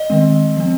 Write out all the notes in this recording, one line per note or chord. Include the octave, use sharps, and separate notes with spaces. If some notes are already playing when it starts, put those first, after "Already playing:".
Already playing: D#5
D#3 G#3 C4
F3 C4